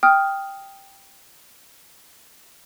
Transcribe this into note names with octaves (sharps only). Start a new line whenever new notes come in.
G5 D#6 F6